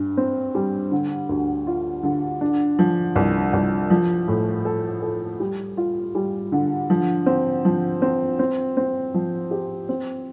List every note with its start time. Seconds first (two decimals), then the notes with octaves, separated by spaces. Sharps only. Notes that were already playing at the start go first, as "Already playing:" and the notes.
Already playing: G2
0.17 C4
0.55 G3
0.92 D3
1.29 D2
1.67 F4
2.03 D3
2.41 D4
2.79 F3
3.16 C2
3.53 C2
3.90 F3
4.28 A2
4.65 A4
5.02 A4
5.40 G3
5.77 F4
6.15 G3
6.52 D3
6.90 F3
7.26 C4
7.65 F3
8.02 C4
8.39 C4
8.77 C4
9.14 F3
9.51 G4
9.89 C4